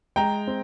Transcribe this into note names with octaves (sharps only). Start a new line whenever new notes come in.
G#3 G5 A#5
C4